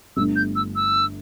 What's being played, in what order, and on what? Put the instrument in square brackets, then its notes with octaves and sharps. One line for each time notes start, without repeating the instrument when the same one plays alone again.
[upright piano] G1 G2 D3 A3 [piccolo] E6
[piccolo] G6
E6
E6